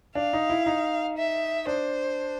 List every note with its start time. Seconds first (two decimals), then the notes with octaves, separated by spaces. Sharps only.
0.15 D4 F5
0.33 D#4
0.50 E4
0.66 D#4
1.17 E5
1.67 D4 C5